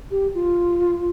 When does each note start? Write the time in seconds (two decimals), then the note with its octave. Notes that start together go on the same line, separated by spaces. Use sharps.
0.11 G4
0.35 F4